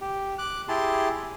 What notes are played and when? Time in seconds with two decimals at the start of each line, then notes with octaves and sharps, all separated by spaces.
0.01 G4
0.38 D6 F#6
0.69 E4 G4 G#4 A5 C6